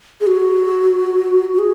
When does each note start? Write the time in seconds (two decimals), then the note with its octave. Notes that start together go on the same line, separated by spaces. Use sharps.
0.21 G#4
0.27 F#4
1.53 F#4
1.59 G#4